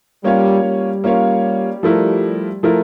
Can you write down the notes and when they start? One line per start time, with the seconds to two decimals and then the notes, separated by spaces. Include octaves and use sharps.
0.24 G3 A#3 C#4 F4 C#5 F5
0.64 G3
1.04 A#3 C#4 F4 C#5 F5
1.83 F3 A3 E4 A#4
2.63 F3 A3 E4 A#4